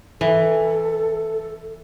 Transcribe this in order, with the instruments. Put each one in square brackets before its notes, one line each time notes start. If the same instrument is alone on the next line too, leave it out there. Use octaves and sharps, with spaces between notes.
[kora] E3 [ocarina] A4